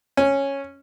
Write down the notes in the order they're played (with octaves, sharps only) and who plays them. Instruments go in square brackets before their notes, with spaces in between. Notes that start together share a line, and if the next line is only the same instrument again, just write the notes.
[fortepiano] C#4